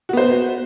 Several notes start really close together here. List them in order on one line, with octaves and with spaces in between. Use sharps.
F#4 B3 C5